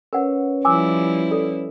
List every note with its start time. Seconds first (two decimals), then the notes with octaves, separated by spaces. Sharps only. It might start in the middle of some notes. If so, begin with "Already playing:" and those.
0.13 C#4 A#4 B4 C#5 F#5
0.65 F3 G3 E4 G#5 D6 E6
1.31 A4 D5